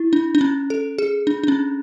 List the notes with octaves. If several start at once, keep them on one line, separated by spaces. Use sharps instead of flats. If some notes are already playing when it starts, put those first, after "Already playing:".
Already playing: E4
D4
D4
C#4
A4
G#4
D4
D4
C#4